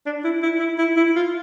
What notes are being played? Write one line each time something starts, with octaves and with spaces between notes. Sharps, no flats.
D4
E4
E4
E4
E4
E4
F4